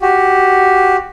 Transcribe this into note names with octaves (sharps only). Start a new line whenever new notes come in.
F#4 G4